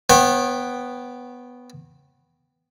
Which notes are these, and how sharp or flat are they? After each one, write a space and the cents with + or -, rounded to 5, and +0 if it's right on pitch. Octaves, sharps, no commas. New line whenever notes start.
B3 +0 C#5 -40 G5 +0